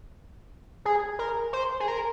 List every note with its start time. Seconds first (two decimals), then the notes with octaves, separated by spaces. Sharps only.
0.85 G#4
1.19 A#4
1.53 C5
1.80 G#4
1.88 A#4